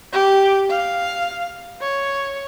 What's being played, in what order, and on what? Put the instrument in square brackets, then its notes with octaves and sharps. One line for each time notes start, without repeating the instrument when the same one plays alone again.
[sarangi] G4
F5
C#5